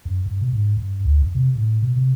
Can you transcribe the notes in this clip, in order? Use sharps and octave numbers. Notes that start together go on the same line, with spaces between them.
F#2
G2
B2
G#2
G2
D2
F2
C3
A2
B2
C3